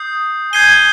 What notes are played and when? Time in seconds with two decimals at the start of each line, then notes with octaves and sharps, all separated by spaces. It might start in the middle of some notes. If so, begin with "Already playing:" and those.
Already playing: D#6 G6 C7
0.53 G#5 G6 C7 D#7 G7